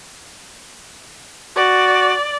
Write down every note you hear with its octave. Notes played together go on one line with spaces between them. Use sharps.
F#4 D5